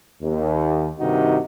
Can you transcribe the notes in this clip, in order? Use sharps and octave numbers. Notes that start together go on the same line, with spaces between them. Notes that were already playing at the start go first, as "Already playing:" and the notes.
D#2
G2 C3 D#3 D#4 F#4